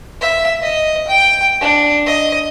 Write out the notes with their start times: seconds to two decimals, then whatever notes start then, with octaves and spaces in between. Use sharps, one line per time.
0.21 E5
0.62 D#5
1.07 G5
1.61 D4
2.06 D#5